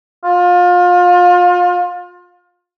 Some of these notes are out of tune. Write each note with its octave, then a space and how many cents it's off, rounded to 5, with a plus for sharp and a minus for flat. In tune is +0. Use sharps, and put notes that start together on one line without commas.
F4 +30